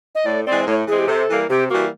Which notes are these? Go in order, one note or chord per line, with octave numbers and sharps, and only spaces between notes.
D#5
A2 D5
E3 G#3 C4 D5
A2 C#5
E3 G#3 C4 G#4
G4
C3 A4
E3 G3 A#3
C3 G4
E3 G3 A#3 F#4